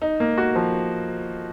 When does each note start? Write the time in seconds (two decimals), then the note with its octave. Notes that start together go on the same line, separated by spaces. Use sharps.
0.02 D#4
0.20 A#3
0.38 F#4
0.56 F3